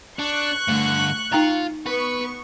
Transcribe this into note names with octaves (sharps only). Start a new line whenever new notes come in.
D4 C#6 F#6
G2 D3 A3
D#4 F4 G5 A#5
B3 B4 C#6